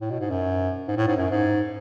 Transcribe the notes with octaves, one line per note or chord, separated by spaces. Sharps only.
A2
B2
G#2
F#2
G#2
A2
G#2
F#2
G#2